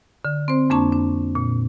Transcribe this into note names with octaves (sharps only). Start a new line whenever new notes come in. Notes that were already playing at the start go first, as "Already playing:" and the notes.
D3
C4 C5
F2 A#3 D4 A5 C#6
D4
A#2